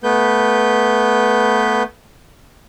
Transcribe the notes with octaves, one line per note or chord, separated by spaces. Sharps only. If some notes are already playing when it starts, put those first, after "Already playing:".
A3 B3 B4 G6